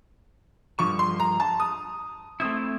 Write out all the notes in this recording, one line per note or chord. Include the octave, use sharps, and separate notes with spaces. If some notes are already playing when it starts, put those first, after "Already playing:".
G2 D3 F3 C#6
C6
A#5
A5
D#6
A3 C4 E4 D#6